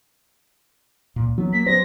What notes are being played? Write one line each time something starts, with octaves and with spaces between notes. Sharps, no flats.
C#2 A#2
F#3 B3
A#3 B6
F#3 B3 G4 C5 A#6